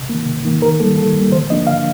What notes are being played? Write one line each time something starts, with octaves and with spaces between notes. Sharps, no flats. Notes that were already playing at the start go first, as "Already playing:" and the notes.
Already playing: C3
D#3 A#3
C3
D#3 A#3
D#3 A#4
G3 A#3 A4
D#3 A4
G3 A#3
D3 C5
F3 A#3 D4 D#5
D3 F5